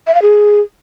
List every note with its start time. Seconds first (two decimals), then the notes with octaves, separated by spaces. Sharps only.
0.07 E5
0.15 F5
0.22 G#4